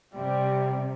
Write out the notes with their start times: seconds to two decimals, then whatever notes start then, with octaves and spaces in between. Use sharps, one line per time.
0.15 C3 G3